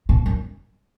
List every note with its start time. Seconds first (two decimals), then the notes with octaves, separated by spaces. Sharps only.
0.09 B2
0.26 F#2